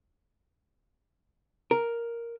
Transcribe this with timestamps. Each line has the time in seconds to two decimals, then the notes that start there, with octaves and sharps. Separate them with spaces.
1.71 A#4